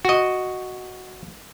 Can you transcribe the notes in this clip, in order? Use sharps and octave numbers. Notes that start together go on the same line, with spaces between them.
F#4 D#5